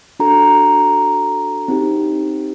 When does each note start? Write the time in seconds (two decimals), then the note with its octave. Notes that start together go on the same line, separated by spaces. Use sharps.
0.20 D4 F#4 A4 A#5
1.68 C4 D#4 G4